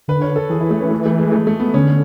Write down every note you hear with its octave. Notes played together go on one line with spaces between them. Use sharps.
D3 B4
C#5
A4
E3 G#4
E4
A3
C#4
A3
A3
G#3
A3
A3
B3
D3 C#4